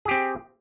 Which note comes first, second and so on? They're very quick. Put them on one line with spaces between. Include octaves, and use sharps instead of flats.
G#4 G4 C4